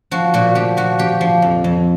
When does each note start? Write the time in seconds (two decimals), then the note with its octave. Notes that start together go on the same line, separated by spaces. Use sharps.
0.11 F3 F#4
0.34 A#2 F#4
0.55 F3 G4
0.77 F3 F#4
0.99 F3 G4
1.21 F3
1.42 F2
1.64 F2